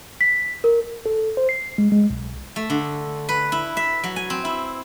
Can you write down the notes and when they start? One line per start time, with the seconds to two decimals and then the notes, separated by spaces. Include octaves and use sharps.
0.21 B6
0.64 A#4
1.06 A4
1.37 C5
1.49 C7
1.78 G#3
1.92 G#3
2.10 B1
2.56 A3
2.70 D3
3.29 B4
3.52 E4
3.77 E5
4.04 F#3
4.16 G#5
4.30 C4
4.45 E4